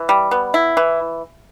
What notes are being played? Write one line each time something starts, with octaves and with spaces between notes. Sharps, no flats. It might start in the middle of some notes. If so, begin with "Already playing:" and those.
Already playing: E3
G3
B3
E4
E3